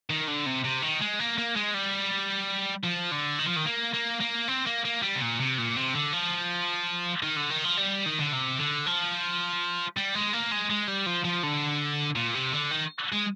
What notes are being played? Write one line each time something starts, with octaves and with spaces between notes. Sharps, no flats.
D#3
D3
C3
C3
D#3
G#3
A#3
A#3
G#3
G3
F3
D3
D#3
F3
D#3
A#3
A#3
A#3
C4
A#3
A#3
G3
C3
A#2
C3
A#2
C3
D3
F3
D#3
D3
D#3
F3
G3
D#3
D3
C3
D3
F3
G3
G#3
A#3
G#3
G#3
G3
F3
F3
D3
A#2
C3
D3
D#3
G#3